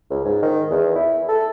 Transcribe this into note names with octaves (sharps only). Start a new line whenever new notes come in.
C#2
G#2
D#3
E2
E4
A4